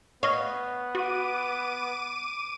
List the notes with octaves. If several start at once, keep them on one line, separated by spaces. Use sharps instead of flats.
B3 C#5 D#5 F5
F#4 D6 D#7